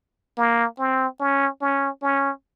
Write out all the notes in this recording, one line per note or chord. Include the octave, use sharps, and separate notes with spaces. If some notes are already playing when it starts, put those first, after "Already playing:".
A#3
C4
C#4
C#4
C#4